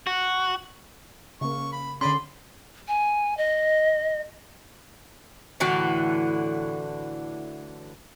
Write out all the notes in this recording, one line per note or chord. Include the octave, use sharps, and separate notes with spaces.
F#4
C#3 A#3 C#6
B5
D3 C#4 G#4 D5 B5 C6
G#5
D#5
A2 D3 E3 F#4